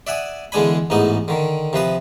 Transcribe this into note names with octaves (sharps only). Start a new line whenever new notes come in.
D5 E5 F#5 G#5 D#6
E2 D3 G#3 D4 G#5 B5
A1 E2 G#2 B3 D#4 D#6
D3 D#3
C3 F3 B4 D#6